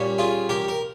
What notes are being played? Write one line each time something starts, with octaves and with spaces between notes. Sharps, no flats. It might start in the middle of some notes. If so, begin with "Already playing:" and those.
Already playing: A#2 G3 C#4
F4 G#4
G4 A#4
A#4